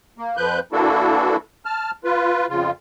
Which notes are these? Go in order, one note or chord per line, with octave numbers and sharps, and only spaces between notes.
A#3
F2 F3 B4 F#6 G6
E3 A#3 D4 E4 F#4 A4
A5 F6
F4 B4
F2 C#3 F4